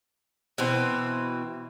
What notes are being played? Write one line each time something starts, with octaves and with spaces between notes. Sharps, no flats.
B2 E3 C4